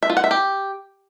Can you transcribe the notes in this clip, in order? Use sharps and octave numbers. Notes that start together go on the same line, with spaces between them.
E5
F4
F#5
E5
G4